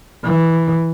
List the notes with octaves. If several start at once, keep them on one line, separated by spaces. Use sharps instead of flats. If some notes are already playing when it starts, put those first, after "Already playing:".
E3